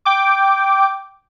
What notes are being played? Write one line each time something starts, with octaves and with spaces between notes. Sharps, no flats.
G5 D6